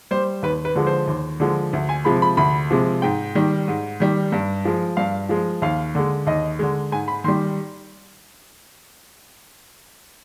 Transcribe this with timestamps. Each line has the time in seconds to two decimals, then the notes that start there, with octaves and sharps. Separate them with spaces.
0.11 G3 C5
0.42 D#2 B4
0.65 B4
0.75 D3 F3 G#3
0.87 C5
1.07 D#2
1.40 D3 F3 G#3
1.73 D2
1.89 G#5
2.05 C3 F3 G#3 B5
2.22 B5
2.37 D2 B5
2.70 C3 F3 G#3
3.02 G#2 G5
3.35 D#3 G3
3.68 G#2
4.00 D#3 G3
4.32 G2
4.65 F3 G#3
4.97 G2 F5
5.29 F3 G#3
5.62 D#2 F5
5.95 D3 G#3
6.27 D#2 D#5
6.59 D3 G#3
6.92 G#2 G#5
7.08 B5
7.24 D#3 C6
7.28 G3